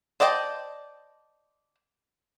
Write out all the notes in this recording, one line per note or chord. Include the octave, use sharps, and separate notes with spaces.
C5 D5 D#5 G5 A5